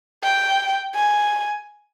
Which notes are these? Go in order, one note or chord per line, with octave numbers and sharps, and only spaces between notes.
G5
G#5